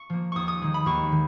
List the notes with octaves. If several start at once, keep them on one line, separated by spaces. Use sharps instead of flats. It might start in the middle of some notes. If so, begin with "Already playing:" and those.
Already playing: C#6
F3 A#3
D#2 C#6 D#6
D#6
D#3 G#3
B5
D#2 C#6
D#3